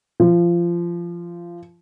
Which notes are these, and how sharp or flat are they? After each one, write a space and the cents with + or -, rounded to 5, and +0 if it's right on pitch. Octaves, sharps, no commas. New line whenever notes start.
F3 -20